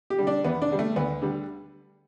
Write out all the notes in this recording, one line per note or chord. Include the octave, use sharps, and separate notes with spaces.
G4
D3 G3
D4
E2 B3
D4
D3 G3
A3
D2 B3
D3 G3